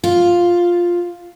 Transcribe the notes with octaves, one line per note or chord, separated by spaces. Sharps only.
F4